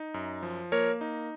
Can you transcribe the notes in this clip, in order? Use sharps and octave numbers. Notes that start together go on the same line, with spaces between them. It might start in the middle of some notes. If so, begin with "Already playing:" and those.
Already playing: D#4
F#2
F3
A#3 A#4 C#5
D#4